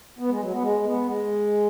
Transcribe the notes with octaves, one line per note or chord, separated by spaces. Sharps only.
B3
G#3
F#3
B3
G#3
B3
G#3